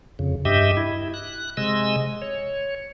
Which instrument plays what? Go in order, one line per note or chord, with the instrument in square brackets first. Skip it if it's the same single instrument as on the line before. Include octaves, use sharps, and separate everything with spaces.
[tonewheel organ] F2 C#3
G2 G4 D#5 E5
E4
F#6
C3 G#3 D#5 E6
C#5